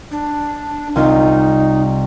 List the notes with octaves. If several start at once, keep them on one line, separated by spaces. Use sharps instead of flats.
D4
C2 D#4 F4